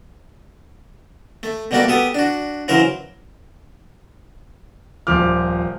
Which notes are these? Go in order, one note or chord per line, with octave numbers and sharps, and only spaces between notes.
A3
B2 G3 A3 A#3 F#4 D5
B3 G4 A4 D#6
D4 F#4
C#3 E3 F#3 A#4 C5
D#1 F3 D6 F6